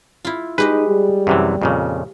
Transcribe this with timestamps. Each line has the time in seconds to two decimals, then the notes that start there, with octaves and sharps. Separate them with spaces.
0.25 E4 F4
0.58 G#3 D#4 G4 B4 D#5
0.88 G3
1.27 F#2 C3 E3
1.62 F2 A#2 C#3